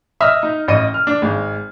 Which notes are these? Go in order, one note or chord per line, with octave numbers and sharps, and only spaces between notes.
D#5 E5 D#6 F6
D#4
A1 D#5 D#7
F6
D4
G#1 G#3